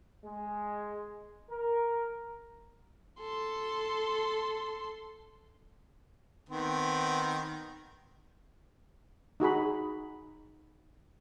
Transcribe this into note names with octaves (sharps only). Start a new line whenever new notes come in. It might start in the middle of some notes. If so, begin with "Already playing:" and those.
G#3
A#4
A4 C6
D#3 B3 C4
D#4 F#4 G#4 B5